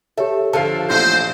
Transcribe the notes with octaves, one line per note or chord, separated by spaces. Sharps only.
G4 A4 C#5 E5
D3 F3 A4 F5
A#1 E2 A3 F4 C5